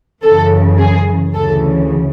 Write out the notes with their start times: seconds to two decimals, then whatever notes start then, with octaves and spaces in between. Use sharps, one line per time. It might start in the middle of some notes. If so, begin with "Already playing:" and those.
0.23 F#2 C#3 E3 A4
0.78 G#4
1.34 D2 C#3 E3 A4